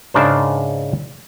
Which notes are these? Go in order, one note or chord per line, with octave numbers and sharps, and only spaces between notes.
G#2 C#3 D4 A#4 C5